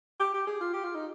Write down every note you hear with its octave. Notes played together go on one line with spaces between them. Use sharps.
G4
G4
G#4
F4
G4
F4
D#4